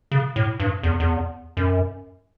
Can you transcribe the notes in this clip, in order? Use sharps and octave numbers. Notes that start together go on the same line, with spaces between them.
C#3
A2
G2
E2
E2
F#2